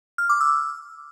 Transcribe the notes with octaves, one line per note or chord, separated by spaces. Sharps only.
F6
D6
E6